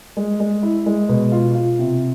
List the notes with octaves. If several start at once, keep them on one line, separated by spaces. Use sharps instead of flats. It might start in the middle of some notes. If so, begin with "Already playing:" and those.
G#3
G#3
E4
G#3
B2
F4
F4
C3